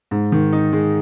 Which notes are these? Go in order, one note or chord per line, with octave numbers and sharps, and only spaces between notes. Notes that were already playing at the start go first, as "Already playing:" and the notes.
G#2
D#3
D#4
G#3